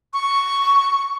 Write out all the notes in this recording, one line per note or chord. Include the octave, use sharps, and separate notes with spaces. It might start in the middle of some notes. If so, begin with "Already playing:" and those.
C#6